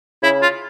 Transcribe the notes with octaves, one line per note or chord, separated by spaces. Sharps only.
C#3 E4
F4